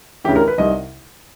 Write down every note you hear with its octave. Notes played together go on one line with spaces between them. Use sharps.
D2 C#3 E3 G4
A#4
B4
C2 C3 D#3 D#5